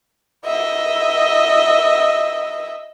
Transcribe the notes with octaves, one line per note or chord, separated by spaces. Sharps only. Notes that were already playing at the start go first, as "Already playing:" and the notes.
D#5 E5